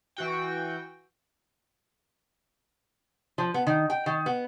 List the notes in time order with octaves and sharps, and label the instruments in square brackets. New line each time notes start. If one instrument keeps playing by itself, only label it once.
[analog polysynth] E3 F#4 G5
[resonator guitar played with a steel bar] F3
B3
D#3
G5
D#3
B3